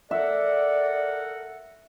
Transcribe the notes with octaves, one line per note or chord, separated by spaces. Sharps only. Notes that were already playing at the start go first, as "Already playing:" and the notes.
A4 A#4 D5 E5 F#5